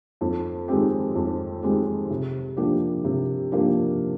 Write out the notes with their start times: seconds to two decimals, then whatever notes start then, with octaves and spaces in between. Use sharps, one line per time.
0.21 F2
0.68 D#3 G#3 C4 G4
1.15 F2
1.62 D#3 G#3 C4 G4
2.10 C3
2.57 F3 A#3 D4 G4
3.04 C3
3.51 F3 A#3 D4 G4